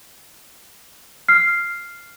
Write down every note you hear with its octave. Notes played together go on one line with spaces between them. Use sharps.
F6 C7